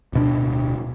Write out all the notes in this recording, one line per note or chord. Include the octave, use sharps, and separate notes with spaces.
D1 B2 D4